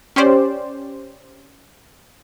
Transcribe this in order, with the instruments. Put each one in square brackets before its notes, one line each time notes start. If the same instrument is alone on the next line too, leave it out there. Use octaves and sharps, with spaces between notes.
[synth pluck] C#4 G4 C5 D5